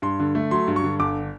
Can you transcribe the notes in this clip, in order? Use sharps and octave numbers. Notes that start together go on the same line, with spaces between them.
G2 C6
D3
A3
F#3 C6
G2
C#6
D3
G1 D6